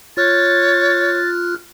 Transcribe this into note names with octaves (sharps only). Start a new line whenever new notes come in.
F4 C#5 F6 F#6 A6